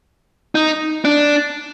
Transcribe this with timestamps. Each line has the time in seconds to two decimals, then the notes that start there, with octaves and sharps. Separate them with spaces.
0.55 D#4
1.05 D4